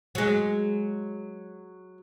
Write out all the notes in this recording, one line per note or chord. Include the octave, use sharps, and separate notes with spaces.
F#3 G#3